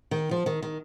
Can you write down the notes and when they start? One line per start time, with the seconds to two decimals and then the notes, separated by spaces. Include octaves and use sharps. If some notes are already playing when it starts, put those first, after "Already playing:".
0.11 D#3
0.31 F3
0.46 D#3
0.62 D#3